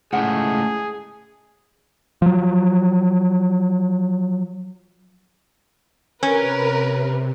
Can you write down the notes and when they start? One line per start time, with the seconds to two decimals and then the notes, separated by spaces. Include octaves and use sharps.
0.13 C#2 A2 G#4 F#5
2.22 F3 F#3
6.23 C3 C#4 A#4 B4